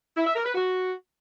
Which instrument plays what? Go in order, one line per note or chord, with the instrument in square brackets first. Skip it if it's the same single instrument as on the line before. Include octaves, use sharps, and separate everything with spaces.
[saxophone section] E4
E5
A#4
B4
F#4